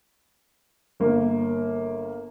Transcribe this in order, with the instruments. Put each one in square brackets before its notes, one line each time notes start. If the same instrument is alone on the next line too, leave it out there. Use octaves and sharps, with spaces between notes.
[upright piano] G1 A#3